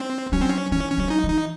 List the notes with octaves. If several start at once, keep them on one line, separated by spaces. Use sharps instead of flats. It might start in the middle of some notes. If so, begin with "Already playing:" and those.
Already playing: C4
F#3 C#4
C4
C#4
E3 C#4
C#4
F#3
D#4
E3
D#4